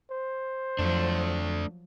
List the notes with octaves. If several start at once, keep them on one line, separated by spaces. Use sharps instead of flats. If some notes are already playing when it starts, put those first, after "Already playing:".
C5
F2 F3 F#3 A3 D4